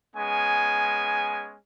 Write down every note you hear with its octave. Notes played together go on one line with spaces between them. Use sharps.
G#3 B3 C#4 G#5